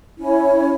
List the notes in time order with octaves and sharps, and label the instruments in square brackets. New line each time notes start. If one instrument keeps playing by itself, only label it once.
[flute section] C#4 E4 C#5